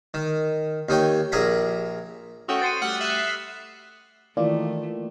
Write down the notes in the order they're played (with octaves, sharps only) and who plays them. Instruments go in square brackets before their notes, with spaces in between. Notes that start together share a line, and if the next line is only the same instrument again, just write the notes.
[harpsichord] D#3
D#2 D#4 C#5 G5
A#1 G#4 A#4 A#5 B5
[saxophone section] A3 C#4 [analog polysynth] F#4 G5 [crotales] D#6
[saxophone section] C5 [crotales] A6 C#7 D#7
[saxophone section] G3 A3 [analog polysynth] F#5 [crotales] F6
[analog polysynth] E5 C7 [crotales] F#6 D#7 F#7
[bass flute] D#3 [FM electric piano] E3 A#3 F4 [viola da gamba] A3 [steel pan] D5